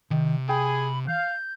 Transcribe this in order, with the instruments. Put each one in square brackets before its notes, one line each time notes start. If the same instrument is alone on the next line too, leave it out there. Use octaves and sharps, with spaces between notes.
[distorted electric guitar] C3 [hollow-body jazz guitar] D#3
[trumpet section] G#4 [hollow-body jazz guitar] G5 [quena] B5
[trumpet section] F5 [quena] G6